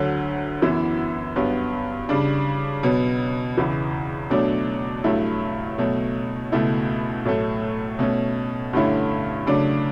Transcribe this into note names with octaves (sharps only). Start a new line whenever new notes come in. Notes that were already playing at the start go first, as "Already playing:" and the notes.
Already playing: D2 D3 F#3
F#2 E3 B3 E4
G2 F#3 B3
C#3 G3 D4
B2 F#3 B3
E2 C#3 E3
B2 F#3 A3 D4
G2 F#3 A3 E4
B2 F#3 A3
C#2 B2 A3 E4
A2 F#3 A3
B2 A3 C#4
G2 D3 A3 C#4 E4
C#3 F#3 A3 D4